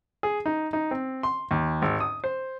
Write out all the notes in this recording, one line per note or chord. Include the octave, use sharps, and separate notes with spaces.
G#4
D#4
D#4
C4
C6
D#2
G#1
D#6
C5